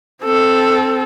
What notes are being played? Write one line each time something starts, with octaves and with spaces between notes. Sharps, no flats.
C4 A4